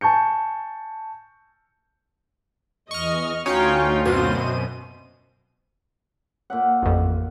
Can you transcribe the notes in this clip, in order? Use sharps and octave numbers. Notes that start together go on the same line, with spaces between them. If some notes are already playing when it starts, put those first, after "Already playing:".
G#5 A5 C#6 G6 C#7
E2 D#5 C#6 F6
D2 C#4 D#4 F4 F#4 C#5 F5 G5
F#2 B2 C4 F#4 C5 D#7
A#2 E5 F#5
A1 F2